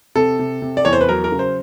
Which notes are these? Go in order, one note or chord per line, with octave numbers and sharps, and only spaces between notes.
C3 A4
C3
C3
D5
E2 C#5
C5
B4
F#3 A#4
A#4
C#3
C5